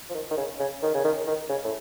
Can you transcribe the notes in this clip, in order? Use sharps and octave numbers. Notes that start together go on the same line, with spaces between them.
F3
D#3
D#3
C#3
C#3
D#3
C#3
D#3
D#3
C#3
A2